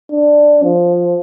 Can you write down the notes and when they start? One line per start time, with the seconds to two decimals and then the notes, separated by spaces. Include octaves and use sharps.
0.12 D4
0.63 F3